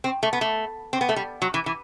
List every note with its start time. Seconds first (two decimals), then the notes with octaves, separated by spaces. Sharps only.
0.04 C4
0.23 A3
0.33 B3
0.41 A3
0.93 C4
1.01 B3
1.09 A3
1.16 G3
1.42 F#3
1.54 E3
1.66 E3